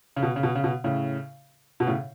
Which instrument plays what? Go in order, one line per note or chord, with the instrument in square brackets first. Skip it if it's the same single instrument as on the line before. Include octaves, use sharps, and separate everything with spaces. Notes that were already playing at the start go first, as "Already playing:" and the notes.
[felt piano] C#3
B2
C#3
B2
C#3
B2
A2 C#3
B2
A2 C#3